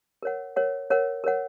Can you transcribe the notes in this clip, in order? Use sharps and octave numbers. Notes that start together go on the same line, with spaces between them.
A#4 C#5 F#5
A#4 C#5 F#5
A#4 C#5 F#5
A#4 C#5 F#5